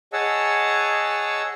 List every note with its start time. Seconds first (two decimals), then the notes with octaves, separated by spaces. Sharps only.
0.13 G#4 C#5 D#5 F#5 A5 E6